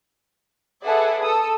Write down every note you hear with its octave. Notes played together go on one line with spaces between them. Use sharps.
G#4 A4 B4 D5 E5 F#5
A4 D#6 E6